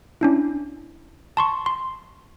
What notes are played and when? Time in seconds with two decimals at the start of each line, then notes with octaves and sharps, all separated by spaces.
0.21 C#4 D4 E4
1.37 A5 C6 C#6
1.66 C6